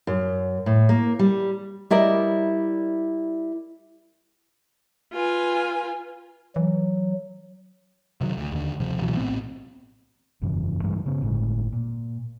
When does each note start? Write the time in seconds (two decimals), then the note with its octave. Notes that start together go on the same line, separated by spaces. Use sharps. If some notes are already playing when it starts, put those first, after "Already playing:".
0.07 F#2
0.66 A2
0.89 A#3
1.19 G3
1.90 G3 E4 A#4 D5 D#5
5.12 F4 B4 G#5
6.56 E3 F#3
8.21 C3 D#3 F#3
8.38 D2
8.52 D#2 D3
8.80 D#1 C3 F3
9.00 C#2 B2 E3 F#3
9.17 A#1 A2 B3 C4
10.42 F1 G2 C#3 E3
10.83 G2 E3 G3 G#3
11.06 C#3 B3
11.22 G1 A2 G#3
11.73 A#2